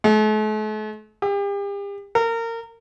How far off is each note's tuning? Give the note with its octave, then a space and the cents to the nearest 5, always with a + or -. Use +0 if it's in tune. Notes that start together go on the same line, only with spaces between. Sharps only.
A3 -45
G4 +40
A#4 -25